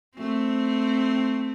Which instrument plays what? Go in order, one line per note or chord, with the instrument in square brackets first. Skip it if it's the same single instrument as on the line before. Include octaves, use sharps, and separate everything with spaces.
[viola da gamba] A3 C4